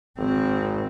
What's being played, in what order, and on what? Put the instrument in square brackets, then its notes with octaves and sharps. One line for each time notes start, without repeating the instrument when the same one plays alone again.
[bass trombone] G#1 [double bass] D#3 C4